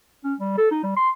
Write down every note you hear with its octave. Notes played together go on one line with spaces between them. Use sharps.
C#4
G3
A4
D#4
G3
C6